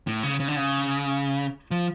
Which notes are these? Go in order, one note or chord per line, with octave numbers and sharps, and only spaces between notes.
A2
C#3
C#3
D3
C#3
F3